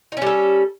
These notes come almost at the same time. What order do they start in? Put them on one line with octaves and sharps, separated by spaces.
D#4 C#4 G3 A4